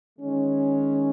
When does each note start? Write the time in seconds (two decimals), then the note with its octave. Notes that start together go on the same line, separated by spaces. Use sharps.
0.19 D#3 G#3 C#4